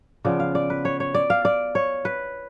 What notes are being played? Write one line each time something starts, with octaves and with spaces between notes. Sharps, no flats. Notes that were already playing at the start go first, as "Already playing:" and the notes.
C#3 F3 B3 D5
F5
D5
B4
C#5
C#5
D5
F5
D5
C#5
B4